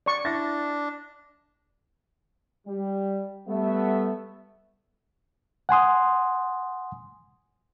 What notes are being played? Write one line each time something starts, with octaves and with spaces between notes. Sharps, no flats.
D5 C#6
D4 E4 A6 A#6
G3
G3 A3 B3 E5
F#5 G#5 C6 D#6